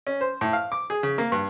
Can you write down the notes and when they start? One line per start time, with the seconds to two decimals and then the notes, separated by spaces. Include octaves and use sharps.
0.07 C#4
0.21 C5
0.41 A2
0.53 F5
0.72 D6
0.90 G#4
1.03 C#3
1.18 A#3
1.32 G2